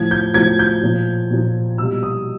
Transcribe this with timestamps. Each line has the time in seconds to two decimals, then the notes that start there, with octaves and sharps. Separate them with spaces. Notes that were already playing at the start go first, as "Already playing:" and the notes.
Already playing: A2 F3 G#6
0.11 G6
0.34 A2 F3 G#6
0.59 G6
0.83 A#2 F3
1.30 A#2 F3
1.78 B2 G3 E6
2.03 D#6